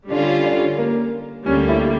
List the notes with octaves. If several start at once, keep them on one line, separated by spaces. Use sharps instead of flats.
D3 G3 C#4 D4 F4
D4
A#3
D2 D3 G3 A#3 C#4
E4